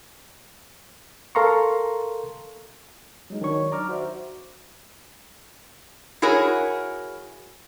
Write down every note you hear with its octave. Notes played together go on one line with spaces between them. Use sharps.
A4 A#4 F5 A#5 C6 C#6
F#3 G#3 D#4
D#3 F#3 D4 D#4 C#5 C#6
D5 A#5 D6 F6
F#4 C5 E5
E4 F#4 G#4 A#4 C#5